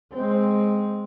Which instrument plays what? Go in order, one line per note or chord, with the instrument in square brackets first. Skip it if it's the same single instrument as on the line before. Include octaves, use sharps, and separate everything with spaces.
[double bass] G#3 C4